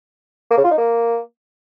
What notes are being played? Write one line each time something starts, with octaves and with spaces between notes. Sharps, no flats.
A#3
C#3
F4
D#4
A#3